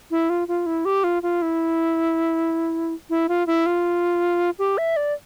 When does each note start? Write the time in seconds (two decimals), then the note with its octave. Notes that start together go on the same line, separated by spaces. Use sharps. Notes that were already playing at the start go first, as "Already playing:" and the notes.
0.11 E4
0.30 F4
0.48 F4
0.66 E4
0.85 G4
1.04 F4
1.23 F4
1.42 E4
3.10 E4
3.29 F4
3.47 E4
3.66 F4
4.59 G4
4.78 E5
4.96 D5